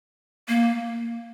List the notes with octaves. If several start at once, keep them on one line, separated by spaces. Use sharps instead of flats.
A#3